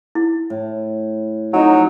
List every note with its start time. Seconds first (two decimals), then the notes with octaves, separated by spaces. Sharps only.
0.15 E4
0.50 A2
1.53 F2 F#3 D#4